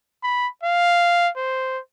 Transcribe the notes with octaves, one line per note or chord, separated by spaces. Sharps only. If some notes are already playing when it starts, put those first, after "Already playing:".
B5
F5
C5